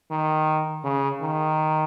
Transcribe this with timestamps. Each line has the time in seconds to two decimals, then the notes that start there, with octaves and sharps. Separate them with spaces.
0.11 D#3
0.84 C#3
1.22 D#3